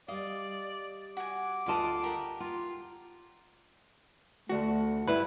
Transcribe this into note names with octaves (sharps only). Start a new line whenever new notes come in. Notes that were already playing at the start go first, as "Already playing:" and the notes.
G3 D5 D#5 F5
F#4 G#5 D6
D2 F4 D5 D#5 F#5 A5
G4 A#4 F#5
F4
D2 A3 F#4
G2 E4 B4